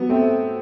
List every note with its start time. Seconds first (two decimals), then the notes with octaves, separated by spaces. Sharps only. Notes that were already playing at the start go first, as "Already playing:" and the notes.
Already playing: F#3 B3
0.09 A3 C4